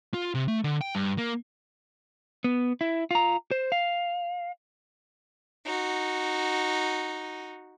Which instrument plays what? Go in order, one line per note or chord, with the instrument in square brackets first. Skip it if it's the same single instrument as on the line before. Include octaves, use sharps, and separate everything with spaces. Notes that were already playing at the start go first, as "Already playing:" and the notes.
[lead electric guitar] F4
C3
A3
D3
G5
G2
A#3
B3
E4
F4 A#5
C5
F5
[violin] D#4 F#4